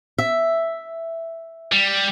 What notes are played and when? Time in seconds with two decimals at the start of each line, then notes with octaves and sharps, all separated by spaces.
0.18 E5
1.72 G3